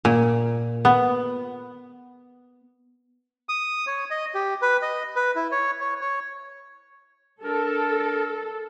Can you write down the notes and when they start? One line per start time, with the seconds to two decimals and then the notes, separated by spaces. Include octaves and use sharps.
0.05 A#2
0.85 B3
3.49 D#6
3.87 C#5
4.10 D#5
4.34 G4
4.62 B4
4.82 D#5
5.16 B4
5.36 E4
5.52 C#5
5.81 C#5
6.01 C#5
7.44 D4 A4 A#4